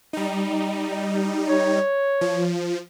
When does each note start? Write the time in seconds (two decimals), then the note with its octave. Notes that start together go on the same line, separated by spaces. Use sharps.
0.13 G3 D#4
1.49 C#5
2.21 F3